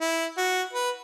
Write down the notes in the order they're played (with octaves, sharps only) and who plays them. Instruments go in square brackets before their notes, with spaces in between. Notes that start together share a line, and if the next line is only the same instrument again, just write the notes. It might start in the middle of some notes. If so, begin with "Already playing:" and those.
[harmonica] E4
F#4
B4